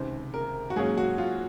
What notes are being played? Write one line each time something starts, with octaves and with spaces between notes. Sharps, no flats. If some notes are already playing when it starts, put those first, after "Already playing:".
Already playing: C#2 C3 D#3 C5
A#4
F#4
G#2 F#3 A#3 C#4 G#4
F#4
F4